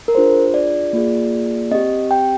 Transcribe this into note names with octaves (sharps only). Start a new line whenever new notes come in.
A#4
D4 F4 G#4 C5
D5
A#3 F4 G#4
C4 G4 D#5
G5